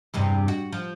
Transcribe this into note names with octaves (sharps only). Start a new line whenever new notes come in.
E2 G2 C3
F#4
F3